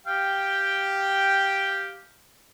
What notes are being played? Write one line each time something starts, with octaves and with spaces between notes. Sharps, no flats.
G4 F5 G5